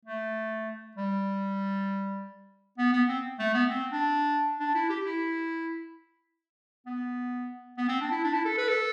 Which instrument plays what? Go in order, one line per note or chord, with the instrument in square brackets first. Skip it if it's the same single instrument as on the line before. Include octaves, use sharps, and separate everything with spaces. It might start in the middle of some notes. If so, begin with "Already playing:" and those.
[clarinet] A3
G3
B3
B3
C4
A3
B3
C4
D4
D4
E4
G4
E4
B3
B3
C4
D4
E4
D4
E4
A4
B4
A4